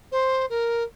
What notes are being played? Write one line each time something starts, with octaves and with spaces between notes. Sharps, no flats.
C5
A#4